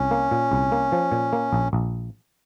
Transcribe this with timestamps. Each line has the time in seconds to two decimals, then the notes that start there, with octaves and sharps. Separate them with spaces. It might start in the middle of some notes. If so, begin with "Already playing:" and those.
Already playing: C2 C#4
0.11 A#3
0.31 A#2
0.52 C2
0.72 A#3
0.92 F3
1.12 A#2
1.33 A#3
1.53 A#1
1.73 A#1